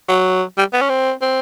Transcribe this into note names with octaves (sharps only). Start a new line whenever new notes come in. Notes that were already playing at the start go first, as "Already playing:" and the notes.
F#3
G3
B3
C#4
C4
C4